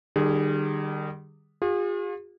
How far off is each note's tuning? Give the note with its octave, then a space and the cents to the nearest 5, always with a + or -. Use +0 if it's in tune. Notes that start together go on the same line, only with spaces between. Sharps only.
D#3 -45 G3 -5 G#4 +0
F4 +40 G#4 -35